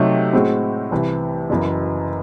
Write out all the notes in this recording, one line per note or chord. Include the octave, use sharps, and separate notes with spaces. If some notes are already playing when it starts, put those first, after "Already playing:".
Already playing: C3 F#3 A3 D#4
A2 G#3 C4 F#4
C2 C3 E3
F#1 F#2 E3